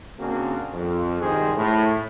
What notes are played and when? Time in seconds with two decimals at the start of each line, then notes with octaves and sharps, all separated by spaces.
0.19 C#3 A#3 C4 D4 F#4 G#4
0.73 F2
1.22 C2 G2 D#3 G#3 G#4 C5
1.57 A2